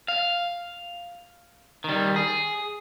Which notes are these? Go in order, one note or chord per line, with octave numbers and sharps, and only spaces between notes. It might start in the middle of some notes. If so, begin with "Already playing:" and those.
F5
D#3 G3
G#4